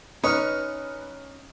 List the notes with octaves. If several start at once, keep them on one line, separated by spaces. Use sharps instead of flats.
C#4 D#4 B4 C#6 F6